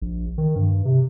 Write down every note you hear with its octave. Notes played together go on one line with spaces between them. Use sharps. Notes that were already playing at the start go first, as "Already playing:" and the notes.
A#1
D#3
G2
C3